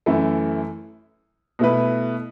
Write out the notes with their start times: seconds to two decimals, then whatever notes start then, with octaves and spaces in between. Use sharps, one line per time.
0.06 F#2 E3 A3 E4
1.59 B2 A3 E4 B4